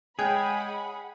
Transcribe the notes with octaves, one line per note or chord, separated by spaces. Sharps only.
G#3 G#4 C#5 F#5 G5 B5 G6